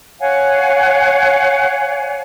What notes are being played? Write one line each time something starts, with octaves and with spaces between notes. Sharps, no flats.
C#5 F5 F#5 G#5